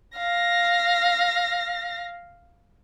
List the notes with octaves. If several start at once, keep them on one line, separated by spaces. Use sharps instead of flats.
F5 A#6